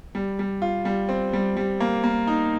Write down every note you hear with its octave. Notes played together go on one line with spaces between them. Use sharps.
G3
G3
F4
G3
C4
G3
G3
A#3
A#3
D#4